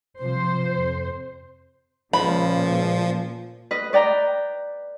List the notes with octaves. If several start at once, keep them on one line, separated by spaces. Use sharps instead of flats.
C3 F3 C5
F2
C#2 A#2 F3 B5
B4 D#5
B4 D5 G5 A#5